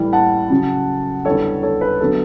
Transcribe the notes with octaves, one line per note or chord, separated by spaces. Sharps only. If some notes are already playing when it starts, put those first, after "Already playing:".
Already playing: A2 E3 G3
F#5 A5
C#3 F#3 C#4
E2 D3 G3 A4 C#5
A4 C#5
B4
D3 F#3 B3 A4